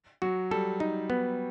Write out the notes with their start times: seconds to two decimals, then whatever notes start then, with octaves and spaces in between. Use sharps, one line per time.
0.22 F#3 F#4
0.51 G3 A4
0.80 D#4
1.10 B3